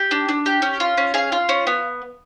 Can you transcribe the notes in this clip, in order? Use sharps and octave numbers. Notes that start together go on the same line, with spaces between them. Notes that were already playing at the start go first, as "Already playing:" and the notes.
Already playing: G4
D4
D4
G4
C#4
F4
C#4
G#4 F5
F4
C#4
B3